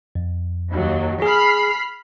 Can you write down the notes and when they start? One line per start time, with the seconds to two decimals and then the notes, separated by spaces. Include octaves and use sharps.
0.15 F2
0.71 D#2 F#3
1.22 G#4 B5 F6 C7